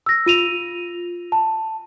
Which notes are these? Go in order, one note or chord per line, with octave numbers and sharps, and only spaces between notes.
E6 A#6
F4 D#7 F7
A5